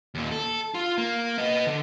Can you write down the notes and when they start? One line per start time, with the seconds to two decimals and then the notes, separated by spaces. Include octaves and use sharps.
0.15 D#2 A#2
0.31 A4
0.75 F4
0.98 A#3
1.38 B3 D#5
1.67 D3